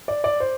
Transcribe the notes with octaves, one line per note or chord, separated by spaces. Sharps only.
D5
D5
C5